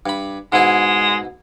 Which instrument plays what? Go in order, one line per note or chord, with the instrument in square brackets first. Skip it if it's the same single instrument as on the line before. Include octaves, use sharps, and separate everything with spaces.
[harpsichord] G2 B5
[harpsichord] G#2 B2 E4 [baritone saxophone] G#3